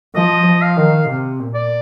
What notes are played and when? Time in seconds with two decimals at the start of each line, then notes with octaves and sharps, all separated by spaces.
0.15 F3 D#5
0.46 F3
0.62 F5
0.77 D#3
1.08 C3
1.40 A#2
1.55 D5